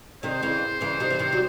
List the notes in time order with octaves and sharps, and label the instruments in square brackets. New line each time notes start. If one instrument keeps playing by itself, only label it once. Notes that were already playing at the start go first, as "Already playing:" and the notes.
[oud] C3 D#3 [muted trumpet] C5
[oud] C#3 E3
C#3 E3
C3 D#3
E3
C3 D#3
F#3